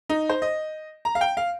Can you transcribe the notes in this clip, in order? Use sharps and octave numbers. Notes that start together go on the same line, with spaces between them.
D#4
C5
D#5
A#5
F5
G5
F5